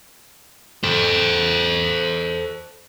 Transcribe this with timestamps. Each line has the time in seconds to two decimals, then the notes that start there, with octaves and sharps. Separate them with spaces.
0.84 A4 C5